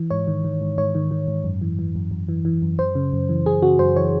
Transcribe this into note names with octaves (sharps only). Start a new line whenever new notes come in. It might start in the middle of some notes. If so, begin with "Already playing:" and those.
Already playing: E3
G#2 C#5
D#3
D#3
G#2
G#2 C#5
D#3
D#3
G#2
F#2
E3
E3
F#2
F#2
E3
E3
F#2
F#2 C5
C#3
F#2
E3
F#2 G#4
C#3 F#4
F#2 C5
E3 C#5